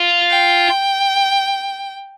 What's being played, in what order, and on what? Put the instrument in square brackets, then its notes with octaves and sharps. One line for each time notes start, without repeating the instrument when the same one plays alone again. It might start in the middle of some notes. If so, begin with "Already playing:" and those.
Already playing: [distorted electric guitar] F4
[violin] G5